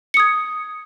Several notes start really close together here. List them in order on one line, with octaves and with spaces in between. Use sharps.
C#7 D#6 G#6